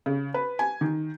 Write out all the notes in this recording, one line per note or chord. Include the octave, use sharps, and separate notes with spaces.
C#3
B4
G#5
D#3